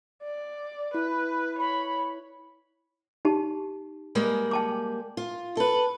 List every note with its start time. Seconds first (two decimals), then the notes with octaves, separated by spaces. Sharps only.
0.23 D5
0.94 E4 B4
1.59 C#5 B5
3.25 D#4 G4 A5
4.15 G3 G#3 A#3
4.51 G5 A5 D6
5.17 F4
5.57 A4 B4